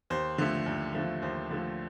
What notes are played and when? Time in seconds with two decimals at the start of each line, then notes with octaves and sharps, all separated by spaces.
0.10 D#2 C5
0.38 D3 F3 A3
0.66 D#2
0.94 D3 F3 A3
1.22 D#2 C5
1.50 D3 F3 A3